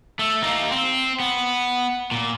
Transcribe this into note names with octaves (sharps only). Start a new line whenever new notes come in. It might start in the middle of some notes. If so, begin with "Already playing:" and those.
A3
A#3 D#4
C4
B3
A#2